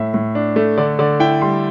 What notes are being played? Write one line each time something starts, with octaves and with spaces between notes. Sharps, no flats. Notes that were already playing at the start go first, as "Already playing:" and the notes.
Already playing: A2 E5
A2
D4
A3
D3 D5
D3 D5
E4 G5
G3 C6